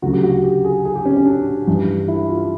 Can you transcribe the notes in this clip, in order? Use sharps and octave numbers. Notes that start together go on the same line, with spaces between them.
D2 C#3 F#3 F#4
G4
F#4
G4
G#4
G#4
G4
C#4
C#4
D4
G2 E3 G3
E4
F4